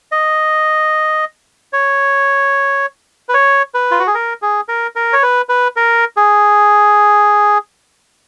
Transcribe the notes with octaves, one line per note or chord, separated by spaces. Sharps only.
D#5
C#5
B4
C#5
B4
F4
F#4
G#4
A#4
G#4
A#4
A#4
C#5
B4
B4
A#4
G#4